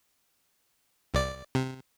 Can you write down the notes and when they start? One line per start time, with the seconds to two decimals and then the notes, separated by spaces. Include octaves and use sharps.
1.14 C2 D5
1.55 C3